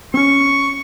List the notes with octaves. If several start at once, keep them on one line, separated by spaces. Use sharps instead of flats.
C4 C#4 C#6